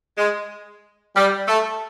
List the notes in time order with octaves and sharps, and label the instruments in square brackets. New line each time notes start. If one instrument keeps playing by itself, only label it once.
[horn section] G#3
G3
A3